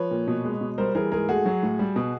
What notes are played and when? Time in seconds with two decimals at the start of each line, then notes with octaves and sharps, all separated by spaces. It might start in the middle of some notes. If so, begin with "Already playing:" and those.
Already playing: F3 B4 C#5
0.11 A#2
0.27 B2
0.45 G#3
0.61 B2
0.78 G3 A#4 C5
0.95 E3 G#4 A#4
1.12 G#2 G#4 A#4
1.29 A3 F#4 G#4
1.46 F#3
1.63 A2
1.79 G3
1.96 B2